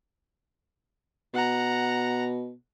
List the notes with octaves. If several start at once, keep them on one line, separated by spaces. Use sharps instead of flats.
B2 F#5 A#5